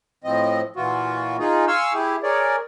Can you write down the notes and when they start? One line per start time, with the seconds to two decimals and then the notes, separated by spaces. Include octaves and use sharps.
0.24 A2 F3 C4 D#5
0.76 A#2 E3 F4 F#4
1.39 D#4 F4 G#4
1.68 F5 G#5 C6 C#6 E6 F6
1.94 E4 G4 G#4
2.23 G#4 A#4 C#5 D5